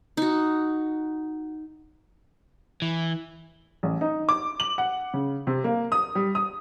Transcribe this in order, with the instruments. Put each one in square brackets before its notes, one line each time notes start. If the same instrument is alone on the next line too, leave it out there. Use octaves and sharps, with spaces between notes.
[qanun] D#4 F#4
[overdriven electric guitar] E3
[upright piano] A1
D#4
D6
F#7
F#5
C#3
C3
A#3
D#6
G3
D#6